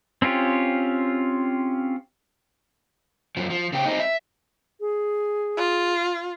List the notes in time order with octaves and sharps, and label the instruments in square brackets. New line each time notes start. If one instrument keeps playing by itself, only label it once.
[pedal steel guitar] C4 C#4 F4 G4
[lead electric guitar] F#2 F3
F3
C#3 G4
C4 D#4
E5
[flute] G#4
[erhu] F4